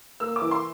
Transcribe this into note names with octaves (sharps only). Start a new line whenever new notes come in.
A#3 E6
D6
E3
C6